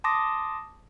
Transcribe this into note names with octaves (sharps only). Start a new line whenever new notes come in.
A5 C6 D6 D#6 A#6